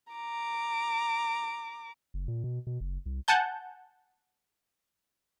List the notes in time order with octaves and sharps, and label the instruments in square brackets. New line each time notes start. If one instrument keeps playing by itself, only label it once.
[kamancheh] A#5 D6
[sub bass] F#1
A#2
B2
B2
F#1
C2
[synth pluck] F#5 G#5 A5 G6